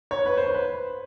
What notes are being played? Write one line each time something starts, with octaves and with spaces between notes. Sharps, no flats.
C#5
B4
C5
B4